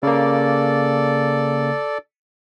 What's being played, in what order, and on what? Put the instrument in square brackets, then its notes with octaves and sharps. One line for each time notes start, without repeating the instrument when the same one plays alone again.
[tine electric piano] C#3 A#3 [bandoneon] A4 D5